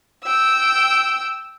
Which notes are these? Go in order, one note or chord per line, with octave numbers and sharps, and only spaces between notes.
G5 E6